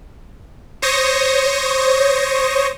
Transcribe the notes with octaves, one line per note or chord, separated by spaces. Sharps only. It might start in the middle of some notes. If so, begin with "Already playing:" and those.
C5 C#5 C#6 D#6 A#6